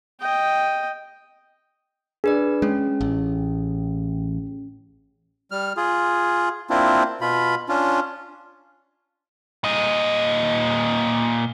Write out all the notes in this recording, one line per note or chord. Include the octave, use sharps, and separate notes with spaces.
D#5 G5
D4 G#4 B4 D5
G#3 C#4
A1
G3 F6
F4 G#4
A#3 C4 D4 E4 F4
B2 F4 B5
C#4 D4 F4
A#2 D#5